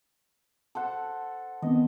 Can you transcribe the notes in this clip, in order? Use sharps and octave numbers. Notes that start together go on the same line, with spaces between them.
A4 C5 F#5
D#3 B3 C4 D#5